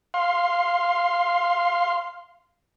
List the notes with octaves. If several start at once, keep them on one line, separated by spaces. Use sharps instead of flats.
F5 C6